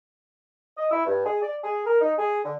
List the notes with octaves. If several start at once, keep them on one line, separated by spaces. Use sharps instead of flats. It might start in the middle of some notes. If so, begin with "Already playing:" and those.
D#5
E4
G2
G#4
D5
G#4
A#4
D#4
G#4
D3